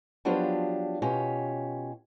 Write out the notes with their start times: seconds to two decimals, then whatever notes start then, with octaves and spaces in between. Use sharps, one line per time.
0.25 F3 F#3 B3 D4 F4 G4
1.02 B2 C#4 F4 G4